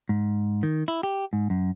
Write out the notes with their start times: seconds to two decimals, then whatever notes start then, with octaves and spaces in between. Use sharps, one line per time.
0.09 G#2
0.63 D#3
0.88 E4
1.03 G4
1.33 G#2
1.50 F#2